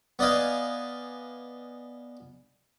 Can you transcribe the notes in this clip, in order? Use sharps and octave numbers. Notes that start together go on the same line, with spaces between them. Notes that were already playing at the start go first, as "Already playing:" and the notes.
B3 D5 D#5 F5 G#5